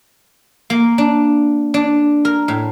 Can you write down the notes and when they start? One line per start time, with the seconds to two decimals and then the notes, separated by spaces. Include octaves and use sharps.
0.70 A#3
0.98 D4
1.74 D4
2.25 A#4
2.48 A2